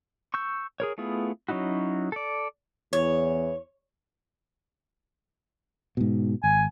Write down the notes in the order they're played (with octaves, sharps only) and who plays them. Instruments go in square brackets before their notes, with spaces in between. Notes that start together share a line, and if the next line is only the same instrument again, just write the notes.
[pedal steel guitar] C#6 E6 G6
G#4 A#4 C#5
A3 B3 E4 F4 G#4
F#3 C#4 D#4 E4 F#4
A4 D5
[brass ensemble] E2 [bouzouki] C#5
[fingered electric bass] G#2 B2
[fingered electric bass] G#1 [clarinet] G#5